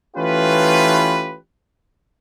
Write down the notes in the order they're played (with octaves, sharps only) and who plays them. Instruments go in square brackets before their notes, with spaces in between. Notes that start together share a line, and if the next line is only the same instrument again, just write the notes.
[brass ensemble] E3 A3 C#4 F4 G4 B4